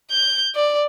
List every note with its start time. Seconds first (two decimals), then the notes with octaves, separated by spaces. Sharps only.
0.11 G6
0.55 D5